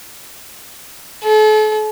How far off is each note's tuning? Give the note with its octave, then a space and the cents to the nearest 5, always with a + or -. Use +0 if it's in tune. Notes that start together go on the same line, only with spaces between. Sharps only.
A4 -40